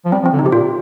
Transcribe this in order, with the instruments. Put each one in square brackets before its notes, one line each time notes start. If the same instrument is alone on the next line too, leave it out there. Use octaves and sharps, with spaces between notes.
[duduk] F3
[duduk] G3 [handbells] C4
[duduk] F3
[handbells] C4
[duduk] D3
[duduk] C3 [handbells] D#4
[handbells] G4
[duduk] A#2 [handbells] F4